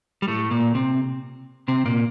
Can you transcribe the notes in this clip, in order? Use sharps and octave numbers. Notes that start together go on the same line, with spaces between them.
G3
A2 A3
A#2 A#3
C3 C4
C3 C4
A#2 A#3